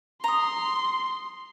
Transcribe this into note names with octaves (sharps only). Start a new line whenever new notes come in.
A#5 C6 D#6